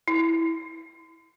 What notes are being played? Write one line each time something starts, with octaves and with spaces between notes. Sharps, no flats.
E4